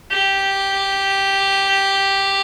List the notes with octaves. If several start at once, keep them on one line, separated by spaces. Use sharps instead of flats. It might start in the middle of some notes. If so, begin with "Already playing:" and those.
G4